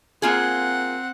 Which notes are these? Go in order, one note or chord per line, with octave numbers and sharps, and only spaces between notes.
A#3 C4 F4 G#4 F#5